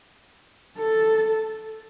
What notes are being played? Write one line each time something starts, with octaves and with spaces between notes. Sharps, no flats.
A4